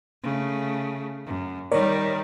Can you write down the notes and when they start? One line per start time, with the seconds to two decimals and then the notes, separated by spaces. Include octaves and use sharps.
0.23 C#3 A3
1.26 F#2
1.72 D#3 G3 A#4 C#5 D5